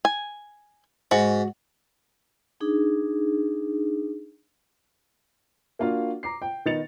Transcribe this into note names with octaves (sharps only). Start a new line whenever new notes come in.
G#5
G#2 F#4
D4 D#4 G#4
A#3 D4 F4 F#4 F5
A#5 D6 C7
G5
D#3 B3 D#4 A6 C#7 F7